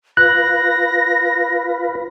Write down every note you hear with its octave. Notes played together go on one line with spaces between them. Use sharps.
F4 B4 F#6 A#6